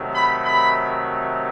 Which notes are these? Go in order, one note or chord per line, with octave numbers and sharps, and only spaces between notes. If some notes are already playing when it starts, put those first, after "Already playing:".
Already playing: C3 D#3 F#3 A3
B5
B5